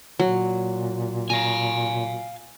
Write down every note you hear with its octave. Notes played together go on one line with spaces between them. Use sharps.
A#2 F#3
F5 G#5 A#5